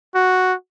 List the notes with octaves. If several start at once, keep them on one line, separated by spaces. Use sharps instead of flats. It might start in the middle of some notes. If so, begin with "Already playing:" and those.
F#4